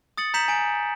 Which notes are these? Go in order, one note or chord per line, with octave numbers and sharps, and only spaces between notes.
D#6 A6 C#7 F#7
A#5 G6 B6 C#7 E7 F#7
G#5 D7